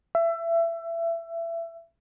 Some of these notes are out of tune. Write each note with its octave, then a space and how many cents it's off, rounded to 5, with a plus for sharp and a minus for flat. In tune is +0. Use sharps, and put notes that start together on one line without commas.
E5 +25